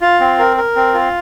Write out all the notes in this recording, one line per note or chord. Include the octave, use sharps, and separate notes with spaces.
F4
C4
A#4
A#4
C4
F4